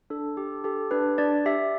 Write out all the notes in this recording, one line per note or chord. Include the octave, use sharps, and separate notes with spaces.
D4 A4
G4
G4 A4
D4 B4
D4 D5
G4 E5